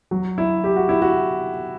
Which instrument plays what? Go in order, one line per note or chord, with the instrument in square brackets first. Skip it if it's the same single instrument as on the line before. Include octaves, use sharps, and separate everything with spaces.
[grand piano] F#3
E4
G4
F#4
E4
F#4